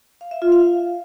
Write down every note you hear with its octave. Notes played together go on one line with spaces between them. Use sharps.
F5
E5
F4
F5